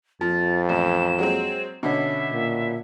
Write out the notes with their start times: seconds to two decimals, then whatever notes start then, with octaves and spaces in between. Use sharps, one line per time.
0.21 F2 F3 A6
0.69 A1 E7
1.19 F#3 G#3 C4
1.83 B2 D3 C#4 E5
2.32 A#2